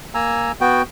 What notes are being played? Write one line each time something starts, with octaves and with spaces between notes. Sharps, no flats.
A#3 G#5 A#5 E6
B3 F#4 G5